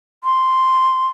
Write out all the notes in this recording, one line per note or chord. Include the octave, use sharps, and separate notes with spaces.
C6